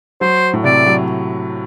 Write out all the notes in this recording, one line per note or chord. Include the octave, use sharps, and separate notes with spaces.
F#3 C5
A2
C3 D5
F#3